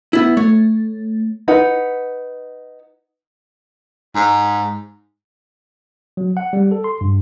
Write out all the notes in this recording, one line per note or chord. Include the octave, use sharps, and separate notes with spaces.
B3 E4
A3 C#5
D#4 B4 F#5
G#2
F#3
F#5
G3
A4
C6
G2